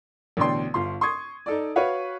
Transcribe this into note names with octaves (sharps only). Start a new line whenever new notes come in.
A1 B2 D3 D5 G5 C6
G1 F4 C6
C6 C#6 D#6 G#6
D#4 A4 D5
F#4 B4 C#5 F5 F#5